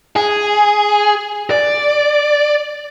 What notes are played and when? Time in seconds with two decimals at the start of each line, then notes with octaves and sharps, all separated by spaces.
0.16 G#4
1.51 D5